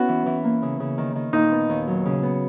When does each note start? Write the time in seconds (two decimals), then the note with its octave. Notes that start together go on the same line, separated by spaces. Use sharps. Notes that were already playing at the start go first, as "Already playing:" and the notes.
Already playing: B3 C#4 E4 F#4
0.09 E3
0.26 E3
0.44 A#3
0.62 C#3
0.80 C#3
0.98 D#3
1.16 D#3
1.33 A#2 D#4
1.52 B3
1.70 D#2
1.87 F#3
2.05 C#3
2.23 B3